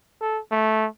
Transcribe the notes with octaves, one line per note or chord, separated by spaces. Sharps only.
A4
A3